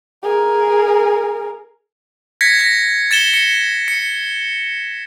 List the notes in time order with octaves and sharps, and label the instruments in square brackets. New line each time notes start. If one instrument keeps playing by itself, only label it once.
[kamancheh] G#4 A#4
[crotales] G#6 A#6 B6 C#7
A#6 B6
A6 C#7 E7 G7
C#7
C#7